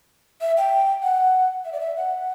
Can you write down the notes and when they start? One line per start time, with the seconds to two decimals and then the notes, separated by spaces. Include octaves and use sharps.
0.41 E5
0.57 G5
1.02 F#5
1.65 E5
1.72 D5
1.80 E5
1.96 F#5